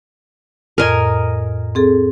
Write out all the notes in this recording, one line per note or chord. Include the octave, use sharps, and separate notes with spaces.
F2 A2 A#4 D#5 G#5
C4 G#4 A4